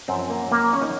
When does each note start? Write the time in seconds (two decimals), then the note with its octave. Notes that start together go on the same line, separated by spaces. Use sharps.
0.08 F#2 F3 C4
0.30 A#3
0.52 A#3
0.73 C#4
0.81 D#4